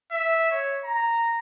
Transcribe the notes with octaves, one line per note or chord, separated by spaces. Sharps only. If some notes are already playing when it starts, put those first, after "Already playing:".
E5
C#5
A#5